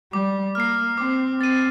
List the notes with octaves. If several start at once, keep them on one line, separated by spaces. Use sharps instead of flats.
G3 D6
A#3 F6 C7
C4 D6
C4 A6 D#7